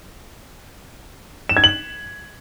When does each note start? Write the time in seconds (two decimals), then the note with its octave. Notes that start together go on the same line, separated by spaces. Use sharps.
1.49 E7
1.57 G#6
1.64 F#7